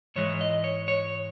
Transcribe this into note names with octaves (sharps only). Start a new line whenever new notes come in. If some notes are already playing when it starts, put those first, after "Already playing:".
G#2 E3 G#3 C#5
D#5
C#5
C#5